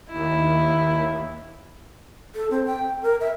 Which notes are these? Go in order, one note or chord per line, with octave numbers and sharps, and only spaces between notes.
D#2 E4
A4
C4
G5
A#4
E5